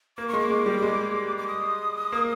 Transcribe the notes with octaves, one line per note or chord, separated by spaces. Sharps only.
A#3 D6
C#6
G#3
D6
G#3
G3
G#3
D6
D#6
A#3